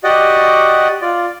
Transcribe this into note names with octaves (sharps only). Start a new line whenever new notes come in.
F#4 G4 D5 D#5 F#5
F4 D5